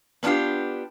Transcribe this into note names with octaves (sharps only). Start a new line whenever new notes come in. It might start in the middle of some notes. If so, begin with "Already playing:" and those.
B3 C#4 D4 E4 F4 G4